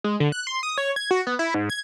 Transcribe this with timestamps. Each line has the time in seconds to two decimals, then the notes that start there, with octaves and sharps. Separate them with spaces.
0.04 G#3
0.20 D3
0.32 F#6
0.47 C6
0.63 D#6
0.78 C#5
0.96 G#6
1.11 F#4
1.27 B3
1.39 E4
1.54 G#2
1.70 G#6